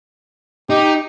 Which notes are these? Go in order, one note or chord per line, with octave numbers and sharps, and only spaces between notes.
D#4 G4